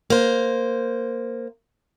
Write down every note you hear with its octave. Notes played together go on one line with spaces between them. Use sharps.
A#3 C5